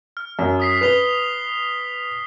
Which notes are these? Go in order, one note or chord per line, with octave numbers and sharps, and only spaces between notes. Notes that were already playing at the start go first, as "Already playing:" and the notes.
F6
F#2
D#6 B6 C7
B4 B6 F7 G7